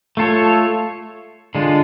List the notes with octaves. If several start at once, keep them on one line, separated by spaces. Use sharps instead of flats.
A3 F4 A4 C#5
D3 G#3 D4 F4